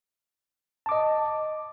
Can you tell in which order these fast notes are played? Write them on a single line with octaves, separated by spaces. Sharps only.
A5 D6 D#5